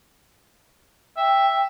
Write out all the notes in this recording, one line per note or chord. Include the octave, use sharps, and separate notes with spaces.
E5 G5